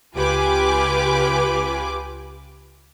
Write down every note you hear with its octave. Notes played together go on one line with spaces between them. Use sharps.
C#2 F4 G4 B4 G#5 D6